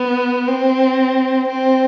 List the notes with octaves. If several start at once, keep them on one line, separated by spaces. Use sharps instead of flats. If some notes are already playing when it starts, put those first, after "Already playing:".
Already playing: B3
C4
C4